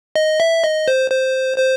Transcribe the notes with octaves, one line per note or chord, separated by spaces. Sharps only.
D#5
E5
D#5
C5
C5
C5